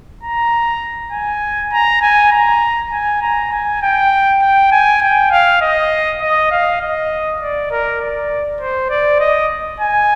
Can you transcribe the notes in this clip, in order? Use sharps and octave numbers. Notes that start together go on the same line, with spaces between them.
A#5
G#5
A#5
G#5
A#5
G#5
A#5
G#5
G5
G5
G#5
G5
F5
D#5
D#5
F5
D#5
D5
A#4
D5
C5
D5
D#5
G#5